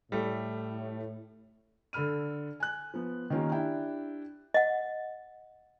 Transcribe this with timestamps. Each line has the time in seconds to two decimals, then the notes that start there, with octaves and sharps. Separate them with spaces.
0.12 A2 G3 A3
1.93 D3 A4 B5 F6 D#7
2.60 G#5 F#6
2.94 F3 B3
3.30 D#3 A#3 C#4 F4 G4
3.52 D4 E4 G4 G5
4.54 D#5 F#5